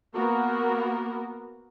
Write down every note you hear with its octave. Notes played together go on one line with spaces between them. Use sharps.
A#3 B3 F#4 A#4